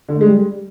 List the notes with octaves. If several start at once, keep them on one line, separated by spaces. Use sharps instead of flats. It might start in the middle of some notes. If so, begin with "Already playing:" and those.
D3
A3
G#3
G3